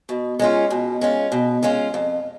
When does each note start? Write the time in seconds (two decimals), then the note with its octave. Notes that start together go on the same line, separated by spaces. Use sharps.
0.09 B2
0.39 G#3 C#4 F4
0.70 B2
1.01 G#3 C#4 F4
1.32 B2
1.63 G#3 C#4 F4
1.94 F2